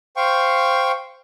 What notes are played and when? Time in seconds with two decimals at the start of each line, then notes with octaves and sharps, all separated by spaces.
0.17 C5 F5 G5 C#6